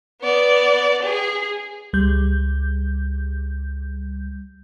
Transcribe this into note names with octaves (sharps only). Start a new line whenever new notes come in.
B3 D5
G#4
C#2 G3 G6